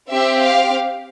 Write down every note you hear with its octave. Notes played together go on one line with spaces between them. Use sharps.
C4 G4 E5
F5